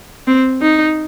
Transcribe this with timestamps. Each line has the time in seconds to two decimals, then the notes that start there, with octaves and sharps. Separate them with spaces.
0.27 C4
0.62 D#4